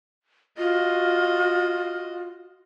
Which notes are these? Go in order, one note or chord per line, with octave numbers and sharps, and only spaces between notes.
F4 F#4 D#5